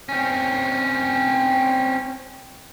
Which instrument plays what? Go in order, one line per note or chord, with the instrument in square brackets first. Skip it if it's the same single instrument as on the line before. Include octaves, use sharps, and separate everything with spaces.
[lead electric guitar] C4 C#4